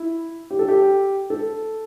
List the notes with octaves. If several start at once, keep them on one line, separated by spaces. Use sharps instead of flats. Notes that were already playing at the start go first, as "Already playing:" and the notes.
Already playing: E4
G4
A4
G4
A4